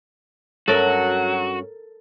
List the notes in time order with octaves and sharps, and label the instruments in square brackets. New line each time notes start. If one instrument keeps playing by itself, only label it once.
[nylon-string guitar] G2 C#4 E5 [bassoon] F#3 [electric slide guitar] F#4 [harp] A4 A#4